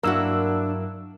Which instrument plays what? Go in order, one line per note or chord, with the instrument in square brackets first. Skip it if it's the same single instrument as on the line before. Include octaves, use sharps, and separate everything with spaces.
[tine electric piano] G2 F#3 [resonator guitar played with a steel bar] A#3 E4 F#4 [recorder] D4 [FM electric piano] A#4 E6